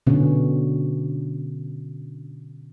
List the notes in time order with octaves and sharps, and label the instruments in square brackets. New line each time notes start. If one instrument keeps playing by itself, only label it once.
[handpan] B2 D3 B3 C#4